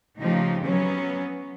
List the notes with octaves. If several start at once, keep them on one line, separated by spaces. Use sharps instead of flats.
C#3 F3 A3 D#4 G4
F#3 B3 C#4